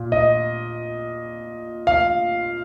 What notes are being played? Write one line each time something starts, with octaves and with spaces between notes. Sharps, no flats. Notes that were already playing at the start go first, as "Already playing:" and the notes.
Already playing: A#2
D#5
F5